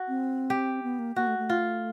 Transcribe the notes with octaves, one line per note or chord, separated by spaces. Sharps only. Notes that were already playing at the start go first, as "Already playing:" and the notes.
Already playing: F#4
C4
G4
B3
A#3
A#3 F#4
A3
A3
F4